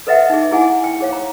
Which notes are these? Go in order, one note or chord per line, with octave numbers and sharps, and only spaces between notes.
A4 B4 D#5 E5 F#5 G5
D#4 G#4
E4 G#4 F#5 G#5
G5
G#4 C#5 F5
A#5